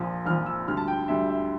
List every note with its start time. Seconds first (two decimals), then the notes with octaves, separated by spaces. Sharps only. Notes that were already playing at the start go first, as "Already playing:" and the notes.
Already playing: A#1 A#2 F3
0.26 A#1 A#2 F3 F6
0.46 E6
0.67 D2 D3 G3 F6
0.77 A5
0.88 G5
1.08 D2 D3 G3 E5
1.29 E5